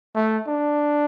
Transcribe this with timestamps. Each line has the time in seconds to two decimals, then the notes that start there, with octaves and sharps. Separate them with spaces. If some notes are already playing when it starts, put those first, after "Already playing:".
0.15 A3
0.47 D4